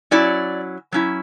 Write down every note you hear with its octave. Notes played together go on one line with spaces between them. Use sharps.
F#3 C#4 E4 D5
F#3 C#4 E4